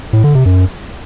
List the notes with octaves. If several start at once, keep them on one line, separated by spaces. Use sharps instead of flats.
A2
D3
C3
F#2